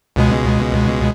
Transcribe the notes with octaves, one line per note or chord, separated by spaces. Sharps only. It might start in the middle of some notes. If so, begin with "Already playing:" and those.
C#2 B2 G#3